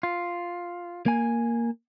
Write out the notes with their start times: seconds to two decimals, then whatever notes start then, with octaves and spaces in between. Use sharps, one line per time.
0.03 F4
1.06 A#3 G#5